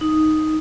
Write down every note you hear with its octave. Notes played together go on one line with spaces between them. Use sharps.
D#4